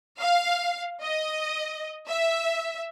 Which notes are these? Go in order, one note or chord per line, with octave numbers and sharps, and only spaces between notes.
F5
D#5
E5